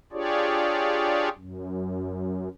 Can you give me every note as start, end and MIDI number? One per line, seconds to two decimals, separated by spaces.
0.12 1.29 62
0.12 1.29 65
0.12 1.29 67
0.12 1.29 68
0.12 1.29 73
0.12 1.29 74
1.37 2.48 42